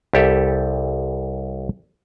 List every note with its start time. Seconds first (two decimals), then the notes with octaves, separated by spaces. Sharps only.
0.13 C2 G4 A4 E5